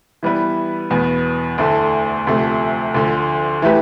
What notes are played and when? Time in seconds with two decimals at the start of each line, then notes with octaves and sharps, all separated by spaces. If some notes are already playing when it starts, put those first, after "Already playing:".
0.23 E3 G3 B3 E4 B4
0.90 E2 B2 B3
1.58 D2 D3 A3 E4 A4
2.27 D2 C3 F3 A3
2.94 D2 D3 F3
3.62 E3 A3 E4 G4 B4